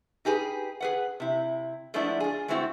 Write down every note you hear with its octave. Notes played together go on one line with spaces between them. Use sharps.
D#4 G4 G#4 B4
G#4 B4 F#5
C3 E4
F3 G#3 A3 B3 D4 E4
F4 G#4
G#3 A3 B3 C4 E4 F#4